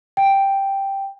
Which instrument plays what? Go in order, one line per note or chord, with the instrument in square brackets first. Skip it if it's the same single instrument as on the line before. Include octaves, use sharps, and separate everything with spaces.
[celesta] G5